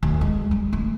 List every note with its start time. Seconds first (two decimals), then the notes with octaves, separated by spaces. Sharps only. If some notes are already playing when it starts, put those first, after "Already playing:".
0.03 D2
0.21 G#3
0.51 G3
0.73 A3